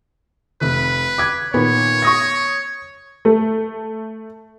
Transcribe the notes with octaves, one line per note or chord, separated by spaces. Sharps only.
F1 B4
D6 G#6
A#2 D#3 B3 C#5
C#6 D#6 A#6
A3